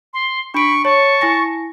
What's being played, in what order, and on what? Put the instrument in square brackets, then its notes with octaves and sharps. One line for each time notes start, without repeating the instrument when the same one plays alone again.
[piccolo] C6
[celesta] D4 D7 [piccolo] B5 [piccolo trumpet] C#6
[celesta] C#5 [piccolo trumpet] A5 [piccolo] C#6
[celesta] E4 G#5 A#6